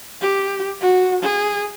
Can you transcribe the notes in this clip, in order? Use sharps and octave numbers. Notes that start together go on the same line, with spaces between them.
G4
F#4
G#4